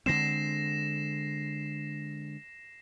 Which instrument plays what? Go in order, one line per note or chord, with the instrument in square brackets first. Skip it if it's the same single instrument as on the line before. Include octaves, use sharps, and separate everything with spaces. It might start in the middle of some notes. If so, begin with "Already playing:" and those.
[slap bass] D3 G#3 C4 [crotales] A#6 C7 E7